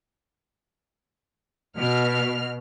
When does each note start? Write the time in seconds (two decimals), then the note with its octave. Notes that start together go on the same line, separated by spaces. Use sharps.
1.77 B2 F6